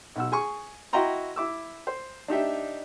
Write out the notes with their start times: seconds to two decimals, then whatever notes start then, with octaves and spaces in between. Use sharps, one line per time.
0.16 B1 F#5 E6
0.32 G#4 G#5 C#6
0.93 E4 F#4 D#5 G5 A#5 C6
1.36 E4 D6 E6
1.87 C5
2.28 D4 D#4 G4 E5